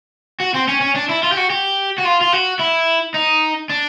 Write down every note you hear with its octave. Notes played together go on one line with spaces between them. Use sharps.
F#4
C4
C#4
C#4
D4
E4
F4
G4
F#4
G4
F#4
F4
F4
F#4
E4
D#4
D4